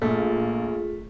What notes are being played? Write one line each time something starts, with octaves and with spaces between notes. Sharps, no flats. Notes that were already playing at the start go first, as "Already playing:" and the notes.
A#1 A3 A#3 F4 G#4